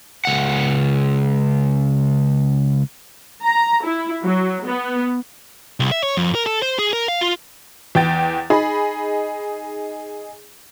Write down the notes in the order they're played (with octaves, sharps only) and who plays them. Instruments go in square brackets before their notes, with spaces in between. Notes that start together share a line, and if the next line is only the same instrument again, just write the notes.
[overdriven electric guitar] C#2 F#5
[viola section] A#5
E4
F#3
B3
[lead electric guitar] C2
E5
C#5
F2
A#4
A4
C5
G#4
A#4
F5
F4
[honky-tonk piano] E2 G5 A6
D#4 G#4 B5